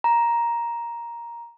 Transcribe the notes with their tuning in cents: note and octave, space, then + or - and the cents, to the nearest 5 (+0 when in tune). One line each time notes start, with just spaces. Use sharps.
A#5 +10